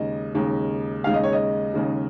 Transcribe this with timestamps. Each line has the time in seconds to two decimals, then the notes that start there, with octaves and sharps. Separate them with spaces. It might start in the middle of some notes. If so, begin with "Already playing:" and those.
Already playing: D#2 C#3 G#3 D#5
0.35 D#2 C#3 G#3
1.04 D#2 C#3 G#3 F5
1.14 D#5
1.24 C#5
1.33 D#5
1.74 D#2 C#3 G#3